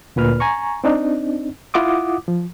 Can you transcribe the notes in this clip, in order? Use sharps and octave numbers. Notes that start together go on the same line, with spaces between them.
D2 A#2 B4 F6
G#5 A#5 C#6
C4 D4 D#4
E4 F4 F#5 D6 D#6
F3